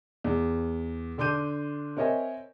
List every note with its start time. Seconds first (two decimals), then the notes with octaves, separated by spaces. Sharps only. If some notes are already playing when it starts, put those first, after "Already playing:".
0.24 E2
1.18 D3 D4 C6 D6 G6 D#7
1.97 C4 A#4 C#5 D#5 E5 G#5